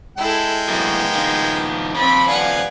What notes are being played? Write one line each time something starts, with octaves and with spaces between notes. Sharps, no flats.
G#3 E4 A4 G5
F#2 A2 A#3 B3
D#3 F3
D#2 F3 C4 B5
B4 D5 F5 F#5 G#5